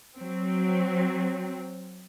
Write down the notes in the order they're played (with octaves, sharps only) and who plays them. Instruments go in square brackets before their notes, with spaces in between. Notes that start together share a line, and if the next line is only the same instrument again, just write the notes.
[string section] F#3 C4